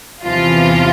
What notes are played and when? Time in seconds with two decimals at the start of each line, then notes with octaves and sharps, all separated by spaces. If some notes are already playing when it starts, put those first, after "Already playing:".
0.25 E2 C3 E3 F3 F4